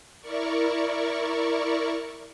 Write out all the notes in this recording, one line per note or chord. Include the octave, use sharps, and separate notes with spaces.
E4 A#4 D5 C#6